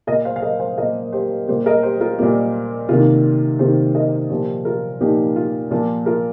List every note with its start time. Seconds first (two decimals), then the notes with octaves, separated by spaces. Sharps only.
0.07 A#2 A#3 A#4 D#5
0.25 C5 F5
0.36 F5
0.42 A#4 D#5
0.60 C5 F5
0.77 A#2 A#3 A#4 D#5
1.12 G4 C5
1.48 A#2 G3 A#3 G4 C5
1.66 A#4 D#5
1.83 G4 C5
2.01 F4 A#4
2.19 A#2 G3 A#3 F4
2.89 C3 D#3 A#3 F4
3.59 C3 D#3 A#3 G4 C5
3.95 A#4 D#5
4.30 A#2 F3 A#3 G4 C5
4.65 F4 A#4
5.01 A#2 F3 A#3 D#4 G4
5.36 F4
5.71 A#2 F3 A#3 F4
6.06 F4 A#4